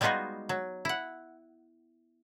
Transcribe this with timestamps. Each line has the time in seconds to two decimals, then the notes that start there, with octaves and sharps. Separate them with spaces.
0.01 G3 G#3 B3 D#4 F4 F#4
0.49 F#3
0.85 E4 F#5